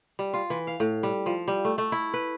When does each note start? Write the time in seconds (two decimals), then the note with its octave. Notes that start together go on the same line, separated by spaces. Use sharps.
0.19 G3
0.34 F4
0.50 E3
0.67 F5
0.80 A2
1.03 G3
1.26 F3
1.48 G3
1.65 A3
1.78 A3
1.92 E4
2.14 B4